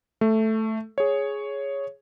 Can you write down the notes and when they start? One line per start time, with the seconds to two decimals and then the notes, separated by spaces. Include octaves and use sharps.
0.21 A3
0.98 G#4 C#5